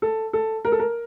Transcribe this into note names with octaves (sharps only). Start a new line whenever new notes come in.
A4
A4
A#4
A4
A#4